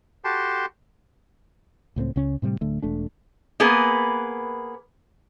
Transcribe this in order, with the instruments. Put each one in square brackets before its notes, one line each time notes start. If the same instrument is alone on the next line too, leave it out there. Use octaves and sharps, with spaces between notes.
[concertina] F#4 G4 A4 G5 A5 C6
[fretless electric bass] C#2 A2 A3 C4
C#2 C#3 C#4
A2 C3 F3 G3
D1 D3 A3
E1 A3 D4
[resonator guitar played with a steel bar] A#3 B3 G#4 B4